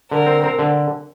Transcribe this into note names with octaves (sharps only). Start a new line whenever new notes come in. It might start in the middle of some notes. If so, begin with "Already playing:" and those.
D3 A#4
C4
C4
D3